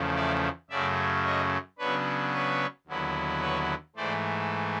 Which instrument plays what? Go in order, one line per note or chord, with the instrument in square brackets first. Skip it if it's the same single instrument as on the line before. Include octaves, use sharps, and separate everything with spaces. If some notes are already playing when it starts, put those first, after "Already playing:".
Already playing: [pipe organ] E2 C#3 F3 A3
D5 E5
F#2 C#3 F#3 A3 D5 E5
C#5 D#5
C#3 F#3 B3 D4 B4 C#5
B4 C#5
D#2 D3 F#3 B3 E4
B4 C#5
G#2 E3 A3 C5 D5